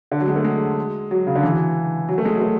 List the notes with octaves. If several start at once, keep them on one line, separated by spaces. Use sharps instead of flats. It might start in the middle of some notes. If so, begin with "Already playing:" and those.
D3
F#3
G#3
A3
G#3
F#3
C#3
D3
E3
F#3
A3
G#3
F#3
A3